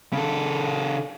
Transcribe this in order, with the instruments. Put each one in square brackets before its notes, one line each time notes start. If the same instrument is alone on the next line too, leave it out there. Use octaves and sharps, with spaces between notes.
[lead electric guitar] C#3 A4